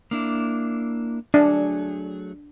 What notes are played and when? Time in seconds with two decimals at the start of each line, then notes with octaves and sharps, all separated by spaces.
0.11 A#3 D4 E4
1.34 F#3 A3 D4 G#4